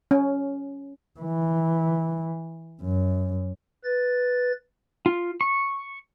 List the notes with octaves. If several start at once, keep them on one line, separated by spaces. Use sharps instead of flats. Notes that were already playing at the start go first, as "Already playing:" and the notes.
C#4
E3
F#2
B4 A6
F4
C#6